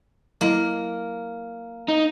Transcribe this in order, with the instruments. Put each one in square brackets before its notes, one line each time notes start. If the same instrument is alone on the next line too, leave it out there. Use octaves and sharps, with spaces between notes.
[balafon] F#3 E4 D#5 [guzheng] A#3
[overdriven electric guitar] D#4